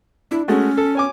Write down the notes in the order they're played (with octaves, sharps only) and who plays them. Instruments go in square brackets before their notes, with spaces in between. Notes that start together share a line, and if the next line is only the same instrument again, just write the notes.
[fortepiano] D4 [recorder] E4
[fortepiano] G#3 A3 F#4 [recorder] C#4
[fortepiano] A4
C#5 G#5 D6